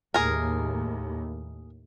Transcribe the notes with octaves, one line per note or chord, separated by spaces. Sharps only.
D#2 A2 G#4 A#4